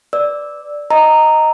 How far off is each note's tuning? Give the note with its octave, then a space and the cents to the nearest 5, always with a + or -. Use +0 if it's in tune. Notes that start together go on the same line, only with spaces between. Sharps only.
B4 +15 D5 +0 E6 -10
D#5 +0 A#5 -10 E6 +0